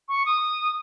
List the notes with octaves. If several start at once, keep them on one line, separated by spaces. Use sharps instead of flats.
C#6
D#6